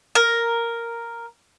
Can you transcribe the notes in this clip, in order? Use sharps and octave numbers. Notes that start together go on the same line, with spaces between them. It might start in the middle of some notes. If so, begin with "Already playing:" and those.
A#4